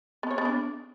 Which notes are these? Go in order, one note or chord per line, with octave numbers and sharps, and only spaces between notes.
B3
C#5
B3
D4